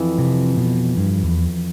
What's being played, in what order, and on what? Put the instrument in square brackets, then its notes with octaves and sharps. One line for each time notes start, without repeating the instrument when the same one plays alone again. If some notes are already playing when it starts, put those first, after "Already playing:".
Already playing: [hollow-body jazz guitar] F2 E3
[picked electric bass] C3
B2
G2
E2